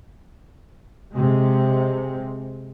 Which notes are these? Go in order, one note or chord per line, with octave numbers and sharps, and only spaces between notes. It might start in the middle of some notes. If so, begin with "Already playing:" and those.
C3 G#3